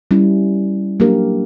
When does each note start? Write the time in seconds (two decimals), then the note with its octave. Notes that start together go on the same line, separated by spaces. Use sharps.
0.11 G3 C#4 E4
1.00 F#3 A#3 D4 G4 A#4